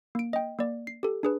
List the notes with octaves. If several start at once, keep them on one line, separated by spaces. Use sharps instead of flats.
A#3 D7
D#5 G5
A#3 D5
C7
G4 A4
D4 G#4 B4